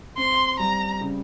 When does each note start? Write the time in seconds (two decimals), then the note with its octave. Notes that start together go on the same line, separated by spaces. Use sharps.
0.18 C4 C6
0.59 G3 A#5
1.01 C#3